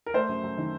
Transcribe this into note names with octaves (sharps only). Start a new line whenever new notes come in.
A#4
A3 C5
F#2
F#2
D#3